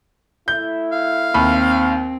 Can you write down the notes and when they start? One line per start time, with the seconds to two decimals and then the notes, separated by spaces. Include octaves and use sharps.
0.48 A3 E4 G6
0.92 F5
1.34 D#2 C4 B5